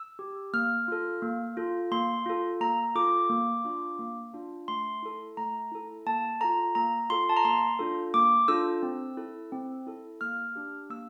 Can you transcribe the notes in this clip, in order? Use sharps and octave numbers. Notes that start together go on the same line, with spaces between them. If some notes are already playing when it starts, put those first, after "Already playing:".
Already playing: E6
G4
A#3 F6
F4 A4
A#3
F4 A4
A#3 C6
F4 A4
A#3 A#5
F4 A4 D6
A#3
D4 F4
A#3
D4 F4
A3 C6
E4 A4
A3 A#5
E4 A4
A#3 A5
F4 A4 A#5
A#3 A#5
F4 A4 C6
A5
A#5
A#3 C6
D4 F4 A4
A#3 D6
D4 F4 A4 E6
C4
E4 A4
C4
E4 A4
A#3 F6
D4 G4
A#3 E6